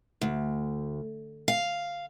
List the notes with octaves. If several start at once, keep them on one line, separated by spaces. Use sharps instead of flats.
D2
F5